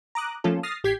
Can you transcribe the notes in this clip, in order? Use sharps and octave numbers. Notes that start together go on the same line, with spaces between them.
A#5 D6 D#6 F#6
F3 A3 A#3 C#4 F4 A4
D#6 F6 A6 A#6 C7
A1 G4 G6 G#6 B6 C7